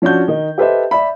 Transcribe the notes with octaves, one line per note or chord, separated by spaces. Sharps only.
F3 C#4 D4 F#4 G6
D#3 D#4
G4 A4 B4 C5 D#5 E5
D5 E5 B5